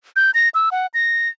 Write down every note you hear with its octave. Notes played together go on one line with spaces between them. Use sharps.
G6
A#6
E6
F#5
A#6